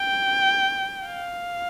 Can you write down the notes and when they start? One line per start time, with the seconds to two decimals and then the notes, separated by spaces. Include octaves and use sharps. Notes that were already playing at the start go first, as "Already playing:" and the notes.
Already playing: G5
1.06 F5